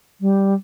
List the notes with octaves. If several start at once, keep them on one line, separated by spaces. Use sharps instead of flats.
G3